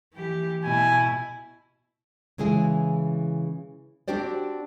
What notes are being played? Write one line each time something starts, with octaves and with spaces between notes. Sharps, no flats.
E3 G4
B2 E4 G#5
C#3 E3 G#3 E4 G#4
C4 D4 F#4 G4 C5 D5